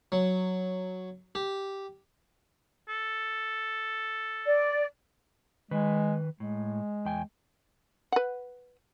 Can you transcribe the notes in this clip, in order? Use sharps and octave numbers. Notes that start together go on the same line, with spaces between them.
F#3
G4
A4
D5
D#3 G#3 B4
A2 G#3
E2 G5 G#5
B4 F#5